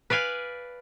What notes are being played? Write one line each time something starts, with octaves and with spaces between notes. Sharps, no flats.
B4 D5 F5 G#5